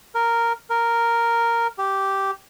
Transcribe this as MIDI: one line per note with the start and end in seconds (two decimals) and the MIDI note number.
0.15 0.53 70
0.70 1.67 70
1.78 2.31 67